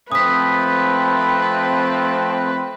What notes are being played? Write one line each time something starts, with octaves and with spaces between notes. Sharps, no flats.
F3 A3 C4 B4 D#6 B6